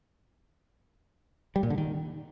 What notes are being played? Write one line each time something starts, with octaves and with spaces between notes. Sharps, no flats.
G3
A#2
D3
D#3